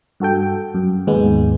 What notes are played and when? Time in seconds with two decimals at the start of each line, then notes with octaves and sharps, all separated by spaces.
0.20 G2 F#4 A4 G5
0.75 F#2
1.07 D#2 G#2 G#3 B3